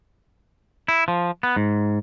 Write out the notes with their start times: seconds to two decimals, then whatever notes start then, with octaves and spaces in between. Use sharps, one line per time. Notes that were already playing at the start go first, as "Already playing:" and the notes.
0.88 E4
1.08 F3
1.43 B3
1.56 G#2